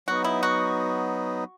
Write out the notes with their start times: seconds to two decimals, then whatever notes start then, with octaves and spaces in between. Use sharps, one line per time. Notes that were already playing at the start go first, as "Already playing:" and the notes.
0.08 F#3 B3 D#4 F#4
0.24 E4
0.43 F#4